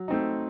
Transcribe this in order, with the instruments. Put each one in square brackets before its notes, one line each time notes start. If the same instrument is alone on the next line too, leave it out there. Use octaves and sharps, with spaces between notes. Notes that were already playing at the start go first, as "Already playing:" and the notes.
Already playing: [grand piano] F#3
A3 C4 D#4